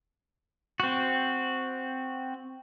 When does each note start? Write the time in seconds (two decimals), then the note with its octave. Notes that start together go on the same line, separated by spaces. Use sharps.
0.80 C4 F#4